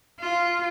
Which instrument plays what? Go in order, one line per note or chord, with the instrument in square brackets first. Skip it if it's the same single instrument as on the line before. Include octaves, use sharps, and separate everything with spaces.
[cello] F4